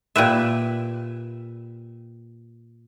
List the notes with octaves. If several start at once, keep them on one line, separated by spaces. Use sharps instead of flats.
A#2 G4 B4 E5